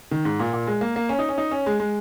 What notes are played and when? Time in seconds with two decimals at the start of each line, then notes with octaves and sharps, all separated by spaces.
0.11 D#3
0.25 G#2
0.40 A#2
0.53 A#2
0.67 G#3
0.81 A#3
0.96 A#3
1.09 C#4
1.19 D#4
1.29 C#4
1.38 D#4
1.51 C#4
1.66 G#3
1.80 G#3